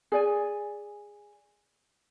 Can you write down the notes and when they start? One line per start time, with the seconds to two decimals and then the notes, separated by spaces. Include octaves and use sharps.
0.12 G#4 D5 G#5